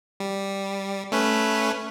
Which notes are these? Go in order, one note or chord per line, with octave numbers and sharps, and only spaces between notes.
G3
A3 C#4 B4